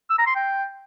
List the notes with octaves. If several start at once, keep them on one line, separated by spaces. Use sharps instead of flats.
E6
A#5
C6
G5